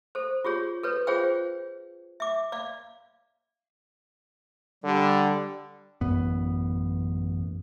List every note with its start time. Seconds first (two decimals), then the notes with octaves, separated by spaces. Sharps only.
0.15 A4 C5
0.45 F4 G4 G#4 C#5
0.83 A4 B4 C#5
1.07 F4 G#4 C5 C#5 F5 G5
2.20 E5 D6
2.52 D5 F5
4.84 D3 G3
6.01 A1 F#2 B3